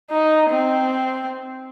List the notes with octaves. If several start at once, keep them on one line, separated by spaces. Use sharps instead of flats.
D#4
C4